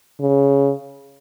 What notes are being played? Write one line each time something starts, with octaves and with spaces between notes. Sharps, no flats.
C#3